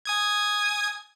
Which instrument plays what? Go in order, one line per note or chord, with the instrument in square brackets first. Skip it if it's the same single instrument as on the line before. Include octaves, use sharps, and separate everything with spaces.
[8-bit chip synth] G#5 D#6 G#6